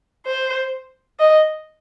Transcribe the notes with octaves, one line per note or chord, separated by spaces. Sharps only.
C5
D#5